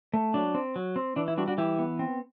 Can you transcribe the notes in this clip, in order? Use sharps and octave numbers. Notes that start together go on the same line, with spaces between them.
A3
F#3 D4
C4
F#3
C4
E3 D4
E4
G3 D4 F#4
D4 F#4
E3 E4 G4
B3
C4